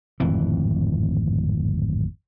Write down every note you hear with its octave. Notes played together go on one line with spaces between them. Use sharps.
D1 G#1 F2 E3